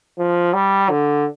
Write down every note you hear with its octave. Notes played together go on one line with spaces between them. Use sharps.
F3
G3
D3